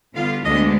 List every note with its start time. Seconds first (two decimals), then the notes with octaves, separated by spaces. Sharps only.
0.15 D3 G3 B3 F4 F5
0.44 D2 D3 G#3 B3 D4 D#5